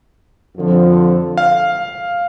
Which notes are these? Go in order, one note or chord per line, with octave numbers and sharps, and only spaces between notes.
F2 D3 F3
F5